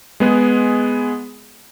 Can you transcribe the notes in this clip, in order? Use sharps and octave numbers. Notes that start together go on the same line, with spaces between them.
G#3 B3 G#4